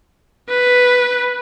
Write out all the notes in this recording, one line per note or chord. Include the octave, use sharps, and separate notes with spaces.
B4